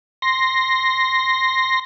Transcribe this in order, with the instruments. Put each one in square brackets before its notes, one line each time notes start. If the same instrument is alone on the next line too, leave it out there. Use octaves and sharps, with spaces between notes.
[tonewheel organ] C6 A#6